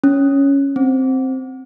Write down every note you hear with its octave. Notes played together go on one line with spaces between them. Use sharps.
C#4
C4